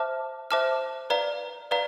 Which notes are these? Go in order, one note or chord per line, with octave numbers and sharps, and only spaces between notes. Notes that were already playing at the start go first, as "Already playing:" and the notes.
Already playing: C5 E5 A5 D6 F6
C5 E5 A5 D6 F6
B4 D5 F5 A#5
B4 D5 F5 A#5